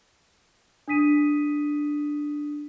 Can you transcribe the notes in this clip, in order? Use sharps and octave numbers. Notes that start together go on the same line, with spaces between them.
D4 D#6 B6 D#7